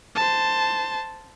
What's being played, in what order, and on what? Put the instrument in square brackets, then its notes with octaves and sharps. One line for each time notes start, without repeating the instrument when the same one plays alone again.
[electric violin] C5 A5